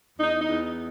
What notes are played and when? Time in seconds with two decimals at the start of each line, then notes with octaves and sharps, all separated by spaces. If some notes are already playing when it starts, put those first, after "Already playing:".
0.19 E2 D#4
0.41 D#4
0.49 E2